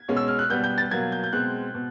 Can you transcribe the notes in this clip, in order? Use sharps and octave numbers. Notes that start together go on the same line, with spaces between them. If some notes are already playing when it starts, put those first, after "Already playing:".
Already playing: G#6
B2 G#3 C#4
E6
F6
F#6
B2 G3 B3 G6
G6
A6
B2 F#3 A#3 G#6
G6
G6
B2 G#3 C4 F#6
B2